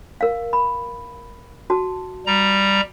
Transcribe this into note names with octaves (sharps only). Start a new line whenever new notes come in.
A#4 F5
B5
F#4 A5
G3 A#5